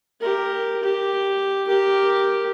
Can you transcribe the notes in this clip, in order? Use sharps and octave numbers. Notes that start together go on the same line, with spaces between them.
G4 A#4
G4
G4 A#4